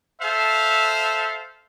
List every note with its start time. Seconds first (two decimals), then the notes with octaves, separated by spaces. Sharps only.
0.22 A4 C5 E5 F5